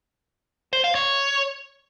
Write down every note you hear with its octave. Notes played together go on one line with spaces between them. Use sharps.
C5
F5
C#5